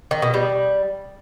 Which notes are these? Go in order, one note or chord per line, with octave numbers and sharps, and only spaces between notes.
D#3
B2
G3